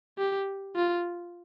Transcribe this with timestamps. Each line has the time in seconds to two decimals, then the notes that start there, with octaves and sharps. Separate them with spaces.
0.18 G4
0.76 F4